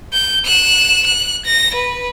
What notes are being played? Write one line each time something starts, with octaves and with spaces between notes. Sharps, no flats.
G6
F#6 E7
F#6
A#6
B4